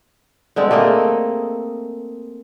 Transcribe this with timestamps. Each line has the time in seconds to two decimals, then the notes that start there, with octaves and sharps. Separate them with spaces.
0.56 D3 G#3 C4
0.71 A3 A#3 G#4 D#5